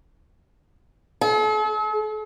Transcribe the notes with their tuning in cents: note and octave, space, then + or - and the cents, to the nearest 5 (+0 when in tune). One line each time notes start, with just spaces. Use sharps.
A4 -45